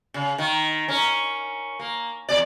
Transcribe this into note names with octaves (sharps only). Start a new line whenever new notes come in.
C#3
D#3
C#4 A#4
A#3
E2 D5